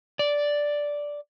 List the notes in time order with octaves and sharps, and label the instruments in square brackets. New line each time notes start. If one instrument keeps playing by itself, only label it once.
[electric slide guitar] D5